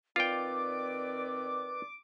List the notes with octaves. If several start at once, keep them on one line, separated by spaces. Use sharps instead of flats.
D#3 C4 F4 B4 D5 G5 D6